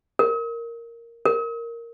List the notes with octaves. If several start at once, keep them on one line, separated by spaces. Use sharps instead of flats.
A#4
A#4